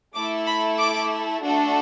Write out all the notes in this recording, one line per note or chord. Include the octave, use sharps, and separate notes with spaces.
A3 E4 A4 D6
B5
D6
A3 D4 F#4 A4